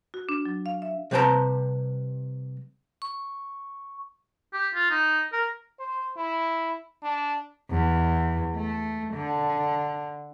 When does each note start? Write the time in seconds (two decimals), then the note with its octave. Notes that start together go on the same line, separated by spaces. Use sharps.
0.14 F#4
0.29 D4
0.45 F#3
0.66 F5
0.82 E5
1.11 C3 G3 B4 C5 A5 A#5
3.02 C#6
4.53 G4
4.75 F4
4.90 D#4
5.32 A#4
5.79 C5
6.17 E4
7.03 D4
7.70 E2
8.55 A3
9.14 D3